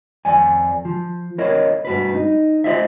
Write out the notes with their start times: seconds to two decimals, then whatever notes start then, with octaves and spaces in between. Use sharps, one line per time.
0.25 F2 D5 G#5
0.85 F3
1.38 E4 A#4 C#5 D#5
1.85 G2 F#4 B4
2.15 D#4
2.64 F4 C5 D#5 E5